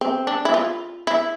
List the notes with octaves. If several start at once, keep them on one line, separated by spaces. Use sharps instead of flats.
C4
D4
E4
F4
E4